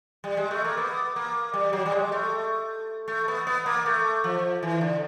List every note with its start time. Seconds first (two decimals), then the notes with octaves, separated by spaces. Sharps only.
0.24 G3
0.37 G#3
0.51 A3
0.64 A#3
0.77 B3
1.16 A#3
1.54 G3
1.73 F#3
1.86 G3
1.92 G#3
2.12 A3
3.08 A3
3.28 B3
3.47 B3
3.66 A#3
3.86 A3
4.24 F3
4.63 E3
4.81 D3